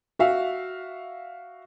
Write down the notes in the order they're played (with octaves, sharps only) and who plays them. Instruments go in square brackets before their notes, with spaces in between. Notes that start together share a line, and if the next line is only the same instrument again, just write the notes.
[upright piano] F#4 E5 F5